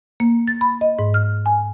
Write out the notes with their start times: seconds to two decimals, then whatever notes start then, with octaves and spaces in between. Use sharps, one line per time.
0.20 A#3
0.47 A6
0.61 B5
0.81 D#5
0.99 G#2
1.14 F6
1.46 G#5